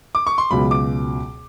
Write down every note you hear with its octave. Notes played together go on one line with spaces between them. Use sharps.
D6
C#6
C6
C#2 B2 F#3 B5
D6